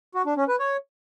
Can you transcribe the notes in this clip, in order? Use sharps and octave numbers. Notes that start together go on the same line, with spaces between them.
F#4
D4
C#4
B4
C#5